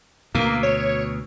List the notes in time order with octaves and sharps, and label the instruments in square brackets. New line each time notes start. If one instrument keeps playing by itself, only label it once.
[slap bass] D2 B2 [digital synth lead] A#3
[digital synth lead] C#5